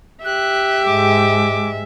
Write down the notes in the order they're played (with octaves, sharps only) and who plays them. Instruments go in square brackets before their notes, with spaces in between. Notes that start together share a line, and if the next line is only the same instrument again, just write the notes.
[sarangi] G4 [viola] E5 [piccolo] F#6
[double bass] G#2 G#3 [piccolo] D6